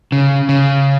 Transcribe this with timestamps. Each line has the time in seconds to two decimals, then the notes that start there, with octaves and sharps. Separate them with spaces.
0.12 C#3
0.49 C#3